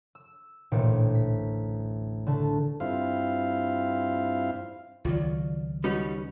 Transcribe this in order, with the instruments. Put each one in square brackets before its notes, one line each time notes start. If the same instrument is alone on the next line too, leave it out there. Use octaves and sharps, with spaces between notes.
[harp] E6
A1 D2 A#2 G5 C#7
B6
D3 A3 A5
[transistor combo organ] G2 C4 E4 F4 F5
[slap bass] C#2 D#3 F#3 [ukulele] F4 D5
[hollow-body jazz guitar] G3 C#4 [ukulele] D#4 F#4 B4